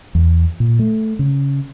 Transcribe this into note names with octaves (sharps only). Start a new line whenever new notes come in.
E2
A#2
A3
C#3